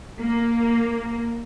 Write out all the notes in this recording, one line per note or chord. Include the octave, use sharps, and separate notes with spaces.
A#3